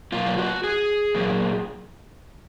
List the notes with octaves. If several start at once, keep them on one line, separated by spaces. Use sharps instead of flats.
B2 F#3 A#3 F4
F#4
G#4
A#2 F#3 A#3